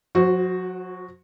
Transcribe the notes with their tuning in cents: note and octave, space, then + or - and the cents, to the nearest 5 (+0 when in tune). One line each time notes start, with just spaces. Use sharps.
F#3 -40 F#4 +0 C5 +0